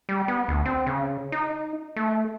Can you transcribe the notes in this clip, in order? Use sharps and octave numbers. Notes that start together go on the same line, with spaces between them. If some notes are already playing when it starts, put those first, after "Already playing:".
G3
B3
D2
C4
C#3
D#4
A3